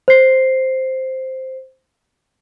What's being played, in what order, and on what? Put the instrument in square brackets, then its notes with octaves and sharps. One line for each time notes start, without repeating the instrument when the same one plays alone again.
[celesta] C5 C7